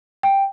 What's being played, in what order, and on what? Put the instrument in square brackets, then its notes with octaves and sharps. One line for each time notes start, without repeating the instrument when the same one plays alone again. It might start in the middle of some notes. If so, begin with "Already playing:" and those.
[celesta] G5